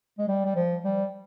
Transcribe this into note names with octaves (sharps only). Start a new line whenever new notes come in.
G#3
G3
G3
F3
G3